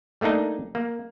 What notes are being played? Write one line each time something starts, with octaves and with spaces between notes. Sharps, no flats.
G3 A3 A#3 D4 D#4
A#3